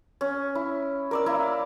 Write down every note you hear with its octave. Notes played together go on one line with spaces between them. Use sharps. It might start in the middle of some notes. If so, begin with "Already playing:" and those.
C#4
E4
A#4 D5 E6
A#3 E4 A#4